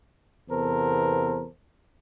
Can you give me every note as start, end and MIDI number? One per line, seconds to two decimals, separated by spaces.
0.50 1.47 40
0.50 1.47 48
0.50 1.47 59
0.50 1.47 69
0.50 1.47 70
0.50 1.47 72